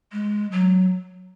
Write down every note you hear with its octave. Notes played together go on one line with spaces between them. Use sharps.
G#3
F#3